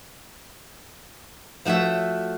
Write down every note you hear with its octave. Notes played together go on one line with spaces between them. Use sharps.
F3 A3 F#4 C#5 E5